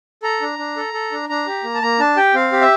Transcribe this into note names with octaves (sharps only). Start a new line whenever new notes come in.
A4 A#5
D4
D4
A4
A4
D4
D4 A#5
G4
A#3
A5
A#3 A#5
D4 A5
G4 G5
C4 F5
G4
E5